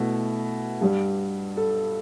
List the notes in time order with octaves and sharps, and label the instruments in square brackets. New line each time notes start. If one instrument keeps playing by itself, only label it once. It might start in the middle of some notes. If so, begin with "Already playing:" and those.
Already playing: [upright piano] B2 A3 E4
G2 G3
A4